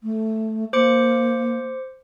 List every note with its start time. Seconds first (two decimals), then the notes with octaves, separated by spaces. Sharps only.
0.03 A3
0.73 A#3 C5 D6 C#7